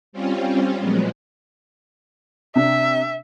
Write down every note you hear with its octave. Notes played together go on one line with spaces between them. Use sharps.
G3 C4 C#4 F4
A#2 F3 F#3 G#3 B3
C3 D4 E5